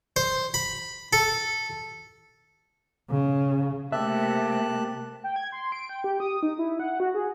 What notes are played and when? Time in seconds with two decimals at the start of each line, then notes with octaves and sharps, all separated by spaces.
0.16 C5
0.54 B5
1.13 A4
3.11 C#3
3.92 C3 A3 A#3 G4 E5 A5 F#6
5.24 G5
5.36 G#6
5.52 C6
5.72 D7
5.89 G5
6.04 G4
6.20 D#6
6.43 D#4
6.58 E4
6.80 F#5
7.00 F#4
7.14 G#4